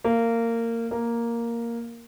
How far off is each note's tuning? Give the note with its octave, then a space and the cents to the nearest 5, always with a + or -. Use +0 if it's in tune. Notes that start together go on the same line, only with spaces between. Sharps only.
A#3 -20
A#3 +0